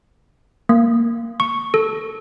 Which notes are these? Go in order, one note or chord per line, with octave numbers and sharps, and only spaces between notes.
A#3
C#6
A4